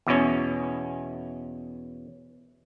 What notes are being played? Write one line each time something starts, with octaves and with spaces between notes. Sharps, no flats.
E2 B2 C#4